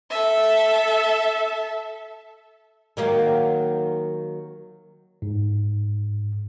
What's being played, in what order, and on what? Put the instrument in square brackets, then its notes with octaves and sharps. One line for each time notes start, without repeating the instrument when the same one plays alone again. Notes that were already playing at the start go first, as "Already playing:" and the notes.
[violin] A4 E5
[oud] D#3 F#3 A#3
[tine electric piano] G#2